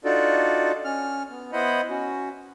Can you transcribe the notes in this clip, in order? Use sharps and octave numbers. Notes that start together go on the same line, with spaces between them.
D4 D#4 F4 F#4 A4 D5
C#4 F6
B3
B3 E4 C5 D#5 F#5 B5
C#4 F#4